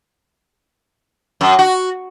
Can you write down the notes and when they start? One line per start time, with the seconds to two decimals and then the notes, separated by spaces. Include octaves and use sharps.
1.41 F#2
1.59 F#4